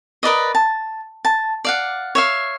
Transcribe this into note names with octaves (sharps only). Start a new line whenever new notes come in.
A#4 B4 D5 D#5
A5
A5
D5 F5 F#5
C#5 E5 F5